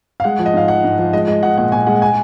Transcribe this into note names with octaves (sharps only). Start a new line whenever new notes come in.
F5
G#3 F#5
F3
D#5
G#2 F5
F3 F#5
G#2
F3
G#3 D#5
G#3 D#5
F3 F#5
A#2 F#5
A#2 G#5
G#3 F#5
G#5